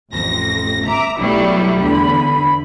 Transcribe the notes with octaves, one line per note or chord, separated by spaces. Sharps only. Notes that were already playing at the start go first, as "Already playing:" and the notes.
A1 F2 A#6
E5 A#5 D6
B1 F#3 G3 A3 E4
E2 D3 B5